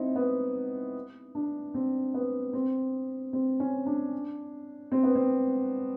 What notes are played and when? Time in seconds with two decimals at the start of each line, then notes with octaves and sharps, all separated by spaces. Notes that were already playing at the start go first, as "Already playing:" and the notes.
Already playing: C4 D#4 E4
0.16 B3
1.35 D4
1.74 C4
2.14 B3
2.53 C4
3.33 C4
3.60 C#4
3.86 D4
4.92 C4
5.03 B3
5.15 C4